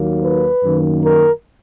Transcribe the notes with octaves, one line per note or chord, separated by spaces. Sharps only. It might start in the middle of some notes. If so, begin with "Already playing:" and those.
Already playing: D#2 D#3 F#3 A#3
B4
F#2 D#3 A#3
A#4